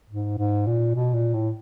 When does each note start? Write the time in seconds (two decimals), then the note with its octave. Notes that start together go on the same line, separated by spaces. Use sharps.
0.10 G#2
0.38 G#2
0.66 A#2
0.95 B2
1.14 A#2
1.34 A2